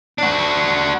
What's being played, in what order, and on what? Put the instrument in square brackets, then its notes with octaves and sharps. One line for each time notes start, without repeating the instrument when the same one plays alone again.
[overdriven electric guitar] D4 F#4